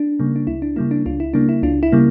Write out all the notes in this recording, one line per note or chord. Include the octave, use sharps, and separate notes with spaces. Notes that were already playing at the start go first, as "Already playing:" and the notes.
Already playing: D4
C#3 G3 A#3
D4
C#2 E4
D4
C#3 G3 A#3 E4
D4
C#2 D4 F4
E4
C#3 G3 A#3 D4
E4
C#2 D4 F4
E4
C#3 G3 A#3